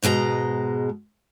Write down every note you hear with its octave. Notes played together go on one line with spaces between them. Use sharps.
G#2 B2 G#3 F#4 A#5